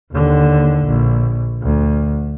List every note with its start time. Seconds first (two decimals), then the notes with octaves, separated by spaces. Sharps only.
0.12 D#2 D3
0.86 A#1
1.62 D2